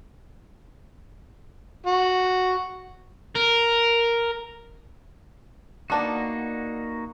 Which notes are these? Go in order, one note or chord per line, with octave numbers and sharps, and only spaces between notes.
F#4
A#4
A#3 B3 D4 D#4 F#4 D5